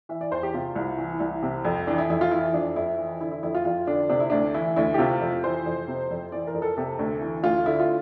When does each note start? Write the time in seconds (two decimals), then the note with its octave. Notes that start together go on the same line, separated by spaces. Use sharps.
0.09 E3 E5
0.21 D5
0.31 E2 C5
0.43 G4
0.54 C3 F4
0.76 C2
0.98 E3
1.20 C2
1.43 C3
1.65 F2
1.87 E3 D4
1.98 E4
2.10 F2 E4
2.21 F4
2.31 E3 E4
2.54 F2 D4
2.76 F2 E4
2.98 E3
3.21 D3 E4
3.31 E4
3.43 F2 E4
3.55 F4
3.65 F2 F4
3.87 D3 D4
4.09 C3 D4
4.20 E4
4.30 D2 D4
4.54 E3 E4
4.76 D2 E4
4.94 G4
4.98 C3 F4
5.20 F2
5.44 E3 C5
5.66 F2
5.88 C3
6.11 F2
6.32 E3 D5
6.47 A#4
6.54 F2
6.62 A4
6.77 C3 A4
6.99 D2
7.21 E3
7.43 D2 F4
7.66 D3 E4
7.80 F4